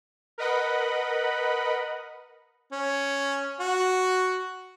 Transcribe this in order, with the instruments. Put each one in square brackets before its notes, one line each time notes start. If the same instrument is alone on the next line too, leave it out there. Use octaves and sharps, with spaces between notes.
[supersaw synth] A#4 B4 D#5 F#5 B5
[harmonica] C#4
F#4